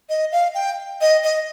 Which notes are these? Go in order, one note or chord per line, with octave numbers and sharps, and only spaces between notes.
D#5
F5
G5
D#5
D#5